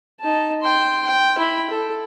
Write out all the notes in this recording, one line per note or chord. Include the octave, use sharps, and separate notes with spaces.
D#4 A5
G5 C6
G5
E4 B5
A4